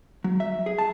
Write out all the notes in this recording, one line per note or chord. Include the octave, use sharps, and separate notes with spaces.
F#3
E5
G#4
A5